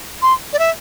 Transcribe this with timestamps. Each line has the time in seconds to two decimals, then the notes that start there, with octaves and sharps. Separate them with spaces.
0.22 C6
0.53 D5
0.59 E5